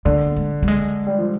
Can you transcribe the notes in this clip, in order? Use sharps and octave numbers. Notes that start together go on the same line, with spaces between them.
D3 A#3
G#3
G3
G#3
G3
F3